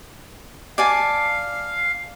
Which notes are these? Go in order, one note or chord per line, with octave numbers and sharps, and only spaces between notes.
D5 F5 G#5 A5